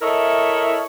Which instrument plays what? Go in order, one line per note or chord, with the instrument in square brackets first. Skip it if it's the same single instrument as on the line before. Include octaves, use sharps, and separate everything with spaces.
[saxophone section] E4 A4 A#4 C#5 D#5 E5